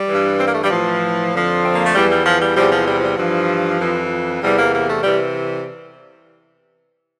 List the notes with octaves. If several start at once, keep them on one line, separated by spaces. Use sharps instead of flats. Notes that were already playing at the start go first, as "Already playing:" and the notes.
Already playing: G3
G2 E3
C4
A#3
A3
G3
A2 E3 F3
F2 D3 F3
C4
A#3
A3
E2 E3 G3
G3
F3
G3
E2 C3 F3 G3
F3
G3
F3
G3
G2 E3 F3
F2 E3
E2 C3 E3 G3
A#3
A#3
A3
C3 E3 G3